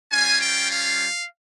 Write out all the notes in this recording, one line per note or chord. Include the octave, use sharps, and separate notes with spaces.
G3 C#4 F4 G#5
G5
F5